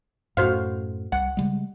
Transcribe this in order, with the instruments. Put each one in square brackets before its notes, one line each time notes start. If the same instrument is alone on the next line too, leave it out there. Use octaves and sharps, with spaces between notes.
[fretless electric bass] F#2 A2 [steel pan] F#4 C5 F5
[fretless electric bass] C2 [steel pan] F#5
[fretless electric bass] C#3 G3 G#3